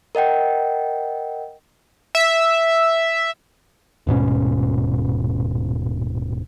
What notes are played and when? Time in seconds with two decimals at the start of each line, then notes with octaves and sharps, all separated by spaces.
0.15 A#4 D#5 F#5 G5
2.15 E5
4.07 D#1 G#2 B2 C#4